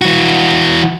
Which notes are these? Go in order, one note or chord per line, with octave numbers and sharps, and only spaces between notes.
E3 F#4